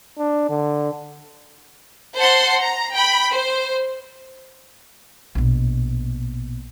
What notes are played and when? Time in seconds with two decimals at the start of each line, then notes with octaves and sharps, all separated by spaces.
0.18 D4
0.49 D3
2.16 C5 F#5 A5 C6
2.61 A#5
2.93 G5 B5
3.30 C5
5.35 A#1 B2